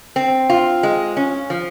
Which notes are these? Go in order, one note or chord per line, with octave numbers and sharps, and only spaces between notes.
C4
F4
G#3
C#4
F3